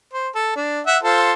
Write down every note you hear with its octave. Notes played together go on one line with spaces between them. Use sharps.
C5
A4
D4
E5 F#5
F4 A4 C5